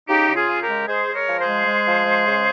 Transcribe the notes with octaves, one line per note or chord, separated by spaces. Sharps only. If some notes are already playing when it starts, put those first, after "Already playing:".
C#3 D#4 G4
C#3
F4 G#4
C#3
G4 A#4
G#3
G#3 G#4 C5
G#3
A#4 C#5
F3
G#4 C5
G#3
G#3
F3
G#3
C#3